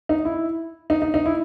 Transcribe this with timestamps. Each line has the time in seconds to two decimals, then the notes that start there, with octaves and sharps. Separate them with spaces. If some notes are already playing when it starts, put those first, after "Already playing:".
0.09 D#4
0.25 E4
0.90 D#4
1.02 D#4
1.14 D#4
1.26 E4